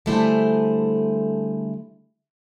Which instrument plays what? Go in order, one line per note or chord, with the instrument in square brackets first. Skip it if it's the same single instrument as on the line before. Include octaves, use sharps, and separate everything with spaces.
[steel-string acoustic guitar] D3 G3 A3 E4 G#4 C5